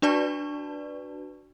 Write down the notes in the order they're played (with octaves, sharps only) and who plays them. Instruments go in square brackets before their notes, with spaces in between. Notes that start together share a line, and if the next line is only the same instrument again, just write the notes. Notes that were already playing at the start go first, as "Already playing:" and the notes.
[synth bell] D4 F#4 B4 D5 A5 C#6